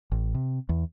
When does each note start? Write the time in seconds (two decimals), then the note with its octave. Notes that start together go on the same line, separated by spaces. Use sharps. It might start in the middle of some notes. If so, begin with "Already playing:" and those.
0.12 A1
0.34 C3
0.69 E2